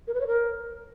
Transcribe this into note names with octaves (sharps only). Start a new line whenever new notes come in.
A#4
B4
C#5
A#4